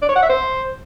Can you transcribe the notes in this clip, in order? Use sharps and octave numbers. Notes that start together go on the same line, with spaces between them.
D5
C#5
F#5
E5
C5